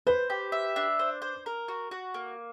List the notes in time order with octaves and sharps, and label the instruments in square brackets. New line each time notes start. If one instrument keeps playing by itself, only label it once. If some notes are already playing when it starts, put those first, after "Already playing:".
[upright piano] B4 [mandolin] C5
[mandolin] G4
E5
D4
C5
C5
A#4
F#4
F#4
A#3